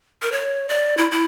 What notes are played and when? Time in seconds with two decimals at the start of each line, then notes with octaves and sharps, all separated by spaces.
0.22 A#4
0.32 C#5
0.69 D5
0.97 E4
1.11 E4